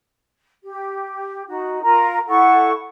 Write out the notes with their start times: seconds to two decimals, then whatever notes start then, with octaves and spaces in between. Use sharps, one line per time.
0.64 G4
1.47 D#4 F#4
1.83 F4 A#4 A#5
2.27 E4 A4 F#5 C#6